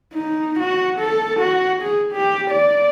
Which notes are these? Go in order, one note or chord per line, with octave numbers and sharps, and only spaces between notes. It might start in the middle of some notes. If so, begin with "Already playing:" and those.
D#4
F#4
A4
F#4
G#4
G4
D5